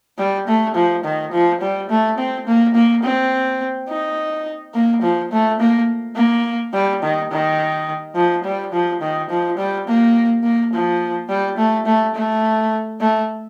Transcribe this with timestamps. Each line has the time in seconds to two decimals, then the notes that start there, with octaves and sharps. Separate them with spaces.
0.18 G3
0.47 A3
0.75 F3
1.05 D#3
1.32 F3
1.61 G3
1.90 A3
2.18 C4
2.47 A#3
2.75 A#3
3.03 C4
3.89 D#4
4.74 A#3
5.02 F3
5.32 A3
5.60 A#3
6.16 A#3
6.74 G3
7.02 D#3
7.31 D#3
8.16 F3
8.44 G3
8.73 F3
9.02 D#3
9.30 F3
9.58 G3
9.88 A#3
10.44 A#3
10.73 F3
11.29 G3
11.57 A3
11.86 A3
12.15 A3
13.00 A3